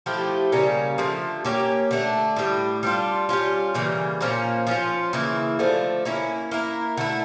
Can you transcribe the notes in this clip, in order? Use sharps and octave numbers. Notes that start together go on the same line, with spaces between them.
F3 A3 E4 G4
C#3 G3 A#3 C#4
D3 F3 A3
A#3 C#4 G4 C#5
D3 A3 D4
A2 G3 D4
G3 D4 F4
G3 C#4 F4
C#3 E3 G3 A#3
A#2 F3 A#3 C#4
F3 C#4 F4
C#3 E3 A#3 E4
D3 F3 A3
A#3 C#4 E4
A#3 E4 A#4
D3 A3 E4